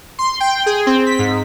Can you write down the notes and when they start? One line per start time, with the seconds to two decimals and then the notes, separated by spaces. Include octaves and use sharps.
0.19 C6
0.40 G5
0.66 G#4
0.87 C4
1.06 B6
1.19 G#2